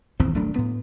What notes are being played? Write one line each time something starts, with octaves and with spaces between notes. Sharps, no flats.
D#1 G#1 E2 C4
D#1 F#3 A3 D4
A2 B3